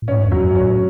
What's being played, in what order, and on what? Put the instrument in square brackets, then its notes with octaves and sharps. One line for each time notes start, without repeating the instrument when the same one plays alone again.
[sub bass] A2
[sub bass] G#2 [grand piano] C#4
[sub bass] E2
[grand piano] F#3
[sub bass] F#2
[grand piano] C#4
[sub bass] A2